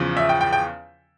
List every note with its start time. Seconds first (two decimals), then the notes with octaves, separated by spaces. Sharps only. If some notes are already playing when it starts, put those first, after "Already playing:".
Already playing: E2 C#3 F3
0.17 E5
0.29 G5
0.41 G5
0.53 G5